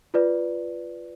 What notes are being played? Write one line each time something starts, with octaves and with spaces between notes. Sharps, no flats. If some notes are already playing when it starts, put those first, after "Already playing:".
F4 B4 D5